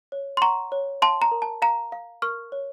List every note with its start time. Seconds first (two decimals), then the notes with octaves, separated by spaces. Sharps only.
0.12 C#5
0.37 C6
0.41 F#5 A#5 C#6
0.72 C#5
1.02 F5 A5 C6
1.22 A#5
1.32 A#4
1.42 A5
1.62 F5 A#5
1.92 F5
2.22 A#4 C#6 F6
2.52 C#5